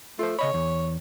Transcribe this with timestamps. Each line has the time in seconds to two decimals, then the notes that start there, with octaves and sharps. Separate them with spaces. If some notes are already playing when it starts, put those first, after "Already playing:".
0.19 A3 F4 C5
0.39 C#3 C#5 D#5 B5
0.54 E2